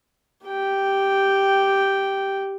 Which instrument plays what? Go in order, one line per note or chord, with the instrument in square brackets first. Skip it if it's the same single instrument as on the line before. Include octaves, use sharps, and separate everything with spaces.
[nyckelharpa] G4 G5